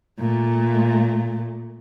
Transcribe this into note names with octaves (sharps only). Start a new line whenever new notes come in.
A#2 A3